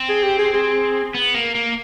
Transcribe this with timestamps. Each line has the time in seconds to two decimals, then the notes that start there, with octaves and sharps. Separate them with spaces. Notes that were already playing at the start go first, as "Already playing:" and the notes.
Already playing: C4
0.09 G#4
0.24 G4
0.39 G#4
0.54 G#4
1.15 B3
1.35 A#3
1.55 A#3